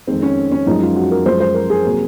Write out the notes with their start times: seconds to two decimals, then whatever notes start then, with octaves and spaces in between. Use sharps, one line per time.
0.07 F2 D#3 G#3 C4
0.23 C#4
0.52 C#4
0.66 F#2 F3 G#3 D#4
0.82 F4
0.96 F#4
1.11 A#4
1.26 F#2 F3 G#3 C5
1.40 C5
1.54 A#4
1.70 G#4
1.84 C3 F#3 A#3